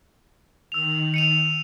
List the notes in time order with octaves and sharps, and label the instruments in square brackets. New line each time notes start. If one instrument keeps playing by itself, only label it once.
[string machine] D#3 [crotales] E6 F7
[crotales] C#7 D#7 F7